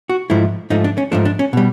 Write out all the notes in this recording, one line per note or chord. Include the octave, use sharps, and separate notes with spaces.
F#4
G#2 F3 A3 E4
G#2 F3 A3 D#4
D4
C#4
G#2 F3 A3 D4
D4
C#4
B2 G3